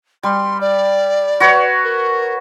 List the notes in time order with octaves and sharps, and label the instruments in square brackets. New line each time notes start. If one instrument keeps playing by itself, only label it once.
[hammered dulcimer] G3 [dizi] C6
[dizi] D5
[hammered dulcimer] F#4 B4 C#5
[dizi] A#4